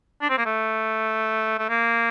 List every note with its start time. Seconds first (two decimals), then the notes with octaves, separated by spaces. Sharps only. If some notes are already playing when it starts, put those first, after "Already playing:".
0.21 D4
0.30 C4
0.38 A#3
0.46 A3
1.59 A3
1.69 A#3